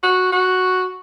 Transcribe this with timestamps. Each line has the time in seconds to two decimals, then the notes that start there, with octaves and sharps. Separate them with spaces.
0.03 F#4
0.32 F#4